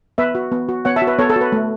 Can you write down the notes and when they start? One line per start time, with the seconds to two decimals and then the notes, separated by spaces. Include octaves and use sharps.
0.18 B3 B4 E5
0.35 F#4
0.52 B3
0.69 F#4
0.85 B3 C#5 F#5
0.96 E5 A5
1.02 F#4
1.07 B4 E5
1.19 B3 A4 C#5
1.30 A4
1.36 F#4
1.41 B4
1.52 A3